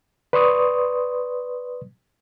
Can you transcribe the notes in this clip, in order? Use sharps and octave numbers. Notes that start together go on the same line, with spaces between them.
B4 D5 C6 C#6 D#6